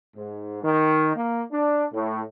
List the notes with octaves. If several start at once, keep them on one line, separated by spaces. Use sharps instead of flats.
G#2
D#3
A#3
D4
A2